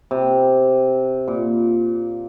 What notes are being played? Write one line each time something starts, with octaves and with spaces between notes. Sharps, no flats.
C3
A#2